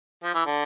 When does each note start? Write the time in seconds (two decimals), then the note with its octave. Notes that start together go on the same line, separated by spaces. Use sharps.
0.23 F3
0.34 E3
0.46 D3